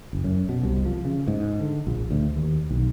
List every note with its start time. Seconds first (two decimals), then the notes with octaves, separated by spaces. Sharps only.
0.13 F#1
0.24 F#2
0.49 B2
0.63 C2
0.86 F3
1.05 C#3
1.28 G#2
1.60 D3
1.87 A#1
2.10 D2
2.36 D#2
2.70 B1